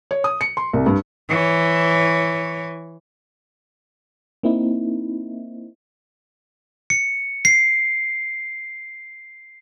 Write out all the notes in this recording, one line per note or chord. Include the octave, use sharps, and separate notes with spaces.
C#5
D#6
C#7
C6
C2
G2
E3 C#5
A#3 C4 D#4 E4
C#7
C7